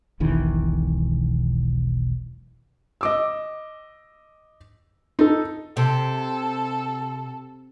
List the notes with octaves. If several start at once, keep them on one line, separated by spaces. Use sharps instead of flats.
E1 B1 D#3 E3
D#5 D6 E6
D#4 A4
C3 A4